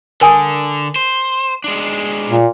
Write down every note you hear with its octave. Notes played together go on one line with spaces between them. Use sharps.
D3 A#4 G#5 D#6
C5
G#3 D4
A#2